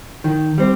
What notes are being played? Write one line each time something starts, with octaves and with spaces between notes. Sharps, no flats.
D#3
G3 C4